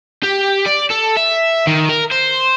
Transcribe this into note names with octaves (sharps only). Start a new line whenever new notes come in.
G4
D5
A4
E5
D#3
A#4
C5